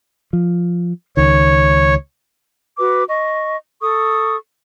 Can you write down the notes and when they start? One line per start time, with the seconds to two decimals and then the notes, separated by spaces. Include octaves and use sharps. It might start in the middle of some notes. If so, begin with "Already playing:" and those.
0.33 F3
1.17 C#2 D#3 C#5
2.78 F#4 B4 D6
3.09 D#5 C#6
3.81 A4 C#6 D#6